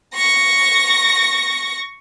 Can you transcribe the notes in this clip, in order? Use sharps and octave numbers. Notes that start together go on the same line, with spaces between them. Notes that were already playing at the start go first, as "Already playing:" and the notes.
C#6 A#6